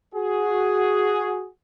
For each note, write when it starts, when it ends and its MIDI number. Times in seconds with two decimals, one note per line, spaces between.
0.15 1.48 66
0.15 1.48 68